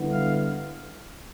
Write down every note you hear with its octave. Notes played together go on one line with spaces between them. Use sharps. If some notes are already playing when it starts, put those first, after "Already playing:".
Already playing: D3 G3 B3 E4
F5